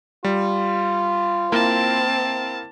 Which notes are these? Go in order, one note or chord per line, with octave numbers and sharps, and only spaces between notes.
G3 F4
A#3 C4 E4 A#4 A5